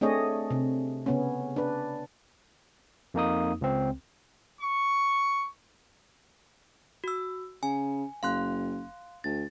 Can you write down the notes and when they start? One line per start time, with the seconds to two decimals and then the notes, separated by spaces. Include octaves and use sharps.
0.01 A3 C4 D4 G#4 C#5 D#5
0.51 C3
1.06 C#3 B3 C#4
1.56 D4 B4
3.14 F2 A#3 D#4 D#6
3.61 C#2 C4
4.61 C#6
7.04 F#4 E6
7.63 C#3 G#5
8.23 F#1 F5 C6 F#6
9.24 D2 A6